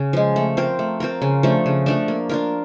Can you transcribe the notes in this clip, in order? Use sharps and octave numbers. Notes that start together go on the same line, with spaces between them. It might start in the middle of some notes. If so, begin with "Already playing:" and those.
Already playing: C#3
F3 G#3
A3
C4 F4 A#4
A3
C4 F4 A#4
C#3
F3 A3 D4
C#3
F3 A3 D4
A#3
D4 F4 A#4